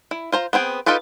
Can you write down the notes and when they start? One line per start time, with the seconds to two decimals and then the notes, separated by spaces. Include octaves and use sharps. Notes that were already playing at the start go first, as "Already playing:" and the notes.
0.11 E4
0.32 F4 C5 A#5
0.53 B3 C4 G#4 G5
0.86 D#4 F4 G4 A4 B4